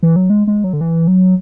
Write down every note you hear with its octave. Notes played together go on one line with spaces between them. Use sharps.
E3
F#3
G#3
G#3
F#3
D3
E3
F#3